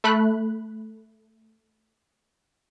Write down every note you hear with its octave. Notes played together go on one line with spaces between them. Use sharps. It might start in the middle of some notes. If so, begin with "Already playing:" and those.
A3 B5 F#6